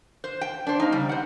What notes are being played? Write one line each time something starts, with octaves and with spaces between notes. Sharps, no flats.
C5
G5
D4 C5
A#3 D#4
C#3 G3
C5 F#5